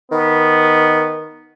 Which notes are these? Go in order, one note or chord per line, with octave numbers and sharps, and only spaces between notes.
D#3 B3